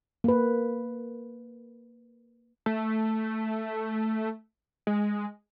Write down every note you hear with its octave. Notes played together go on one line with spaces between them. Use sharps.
A#3 B4
A3
G#3